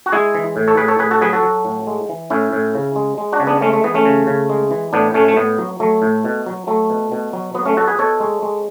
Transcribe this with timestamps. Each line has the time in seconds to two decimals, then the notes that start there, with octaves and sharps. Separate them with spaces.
0.06 F#4
0.12 G#3 E4 G#4
0.35 E3
0.56 A2
0.67 A4 C#5
0.77 A2 G#4 B4
0.88 A4 C#5
0.99 A2 G#4 B4
1.11 F#4 A4
1.21 F#3 G#4 B4
1.33 F#4 A4
1.43 F#3
1.65 A2
1.87 G#3
2.09 E3
2.30 A2 C#4 E4
2.53 A2
2.75 C#3
2.96 G#3
3.18 G#3
3.32 D4 F#4
3.40 C#3
3.47 B3 D4
3.62 G#3 A3 C#4
3.73 A3
3.84 E3 B3
3.94 A3 C#4
4.05 C#3
4.27 C#3
4.50 G#3
4.71 E3
4.93 A2 B3 D4
5.14 A2 A3 C#4
5.28 A3
5.37 A2 B3
5.58 F#3
5.80 F#3 A3
6.02 A2
6.25 B2
6.46 F#3
6.67 F#3 A3
6.90 B2
7.12 B2
7.33 F#3
7.55 F#3 B3
7.65 A3 C#4
7.77 B2 F#4 A4
7.87 G#4 B4
7.99 B2 A4 C#5
8.20 G#3
8.42 G#3